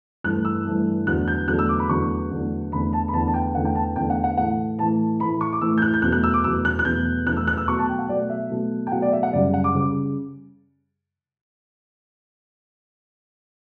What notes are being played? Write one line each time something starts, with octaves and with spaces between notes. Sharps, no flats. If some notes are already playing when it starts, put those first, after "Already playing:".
G2 E3 A3 F#6
E6
G2 E3 A3
E2 D3 F#3 A3 F#6
G6
E2 D3 F#3 A3 F#6
E6
D6
B5
E2 D3 F#3 A3 C#6
E2 D3 F#3 A3
E2 D3 A3 B5
A5
B5
E2 D3 A3 A5
A5
G5
E2 D3 A3 F#5
G5
A5
E2 D3 A3 G5
F#5
F#5
A2 E3 A3 F#5
A2 E3 A3 A5
A2 E3 A3 B5
C#6
D6
A2 E3 A3 E6
G6
F#6
G6
E2 B2 F#3 A3 F#6
F#6
E6
D6
E2 B2 F#3 A3 E6
F#6
F#6
E2 B2 F#3 A3 G6
E2 B2 F#3 A3 F#6
E6
F#6
E6
B2 F#3 A3 C#6
A5
G5
F#5
B2 F#3 A3 D5
E5
B2 F#3 A3
G5
B2 F#3 A3 F#5
D5
E5
F#5
F#2 C#3 G3 D5
F#5
D6
C#3 G3